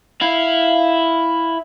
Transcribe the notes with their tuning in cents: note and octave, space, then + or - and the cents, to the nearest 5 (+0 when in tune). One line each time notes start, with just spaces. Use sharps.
E4 +0 F5 +0